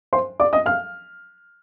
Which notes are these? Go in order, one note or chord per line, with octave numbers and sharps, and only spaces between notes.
C5 C6
D5 D6
D#5 D#6
F5 F6